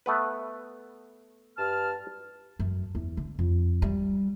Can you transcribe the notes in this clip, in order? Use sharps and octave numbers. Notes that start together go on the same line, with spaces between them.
A3 B3 B4
G2 A5 F6
F#2
E2
D3
F2
G3